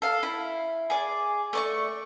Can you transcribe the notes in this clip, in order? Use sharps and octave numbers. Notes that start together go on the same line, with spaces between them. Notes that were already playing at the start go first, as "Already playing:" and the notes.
A4 F5
E4
G#4 D5
A3 D5 C#6